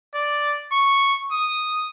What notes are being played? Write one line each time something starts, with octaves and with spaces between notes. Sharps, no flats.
D5
C#6
D#6